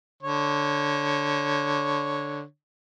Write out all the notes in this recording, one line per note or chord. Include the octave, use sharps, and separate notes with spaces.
D3 C#5